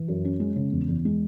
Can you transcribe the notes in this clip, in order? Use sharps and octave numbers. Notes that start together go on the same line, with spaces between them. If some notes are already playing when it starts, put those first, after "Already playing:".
Already playing: E3
F#2
C#4
G#3
C#3
E2
E2
G#3